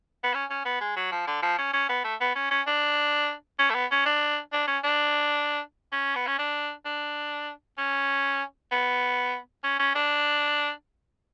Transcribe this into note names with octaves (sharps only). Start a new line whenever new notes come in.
B3
C#4
C#4
B3
G#3
F#3
F3
D3
F3
C#4
C#4
B3
A3
B3
C#4
C#4
D4
C#4
A3
B3
C#4
D4
D4
C#4
D4
C#4
B3
C#4
D4
D4
C#4
B3
C#4
C#4
D4